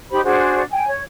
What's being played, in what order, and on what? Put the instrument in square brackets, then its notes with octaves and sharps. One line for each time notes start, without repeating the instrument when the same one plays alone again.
[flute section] D#4 G4 C5 B5
D4 F#4 G#4 C5
G5 G#5
C#5